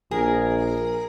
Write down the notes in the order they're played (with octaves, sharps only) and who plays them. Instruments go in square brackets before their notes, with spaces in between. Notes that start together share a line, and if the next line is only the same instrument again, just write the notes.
[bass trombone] A#1 [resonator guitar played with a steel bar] G#4 [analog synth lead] A#4